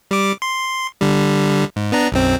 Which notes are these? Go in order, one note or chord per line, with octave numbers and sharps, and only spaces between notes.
G3 D6
C6
D3 G3
G#2
B3 D4 A#5
B1 F#2 C4